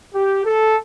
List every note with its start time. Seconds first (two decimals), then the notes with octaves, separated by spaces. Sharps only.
0.14 G4
0.44 A4